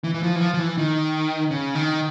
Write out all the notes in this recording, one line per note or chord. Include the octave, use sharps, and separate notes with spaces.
E3
E3
F3
E3
F3
F3
E3
D#3
C#3
D#3